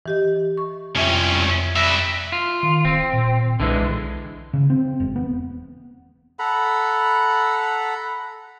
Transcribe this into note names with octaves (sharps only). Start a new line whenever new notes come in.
E3 G4 D#5
C#6
C2 F2 C#4 E5 G5
G3 E5 B5 F#6 A#6
F4
D#3
D#1 C4
A#2
B1 D3 E3 G#3
C#3
C4
E1
B3
A4 F#5 A#5 B5